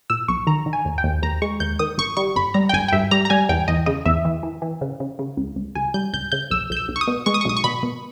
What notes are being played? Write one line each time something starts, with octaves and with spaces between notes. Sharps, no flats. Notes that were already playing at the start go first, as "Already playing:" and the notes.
A#2 E6
B1 C#6
D#3 A#5
D#3
G#5
D#2
G5
D#2
D#2 A#5
G#3 C#6
D#2 G6
D#3 D#6
G1 C#6
G3 C#6
G1 B5
G3 A#5
G5
G1 G#5
G5
G2 E5
G3 A#5
A#5
G3 G#5
E2 G5
E2 D#5
C#3 D#5
E2 E5
E3
E3
E3
C#3
C#3
C#3
C#2
C#2
C#2 G#5
G3 G6
C#2 G6
C#3 G6
B1 E6
B1 G6
E6
B1
C#6
D#6
B2
G#3 C#6
D#6
C#6
B1 D#6
C#6
B2 B5
B2